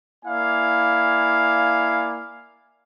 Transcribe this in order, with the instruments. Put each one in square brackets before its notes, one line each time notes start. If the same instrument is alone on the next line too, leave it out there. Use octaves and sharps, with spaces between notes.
[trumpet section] A#3 E4 D5 F5 G#5